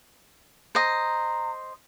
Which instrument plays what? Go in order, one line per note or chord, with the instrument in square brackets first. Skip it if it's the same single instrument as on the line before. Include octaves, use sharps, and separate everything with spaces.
[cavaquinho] C5 D#5 [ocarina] A#5